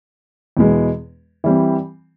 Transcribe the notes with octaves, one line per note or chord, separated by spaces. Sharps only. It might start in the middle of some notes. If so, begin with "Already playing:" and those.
E2 B2 G#3 B3
E3 G3 C4